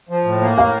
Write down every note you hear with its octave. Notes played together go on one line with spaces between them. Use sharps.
F3
A2
A#3
A2 F5